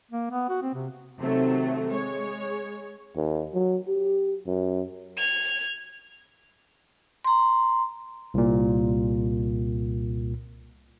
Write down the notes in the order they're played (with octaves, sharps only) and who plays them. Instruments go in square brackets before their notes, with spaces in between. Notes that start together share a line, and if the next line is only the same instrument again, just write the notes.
[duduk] A#3
B3
F#4
C4
C3
[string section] C3 D#3 F#3 A3
G#3 C#5
[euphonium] D#2
F#3
G4
F#2
[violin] G#6 F7
[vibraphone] A#5 C6
[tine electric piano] C2 A#2